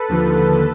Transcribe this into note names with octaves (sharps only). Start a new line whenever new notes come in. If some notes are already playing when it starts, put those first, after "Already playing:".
Already playing: A4 B4
D#2 D3 F3